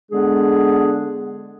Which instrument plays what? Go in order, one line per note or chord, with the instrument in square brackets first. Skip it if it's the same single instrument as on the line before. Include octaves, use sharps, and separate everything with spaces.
[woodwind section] D3 G#3 B3 D4 G#4